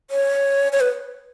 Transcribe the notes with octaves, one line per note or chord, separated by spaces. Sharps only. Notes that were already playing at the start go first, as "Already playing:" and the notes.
C#5
C#5
B4